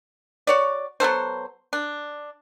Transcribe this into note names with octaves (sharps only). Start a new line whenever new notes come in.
F#4 C#5 D5
F#3 B3 A4 C5
D4